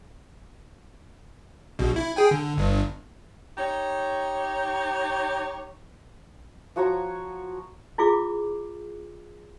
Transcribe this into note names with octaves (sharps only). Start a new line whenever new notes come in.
A#1 B2
E4
G#4 G5 G#5
D3
G1 G2
D#4 G4 C#5
F3 F#4 C#5 A#5
E4 F4 G#4 D6